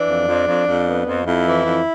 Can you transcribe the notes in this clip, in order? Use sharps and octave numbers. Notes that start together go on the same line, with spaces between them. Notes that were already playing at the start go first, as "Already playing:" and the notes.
Already playing: E3 D4
F2
F2
F2
F2
B3
F2
F2 E4
E3
F2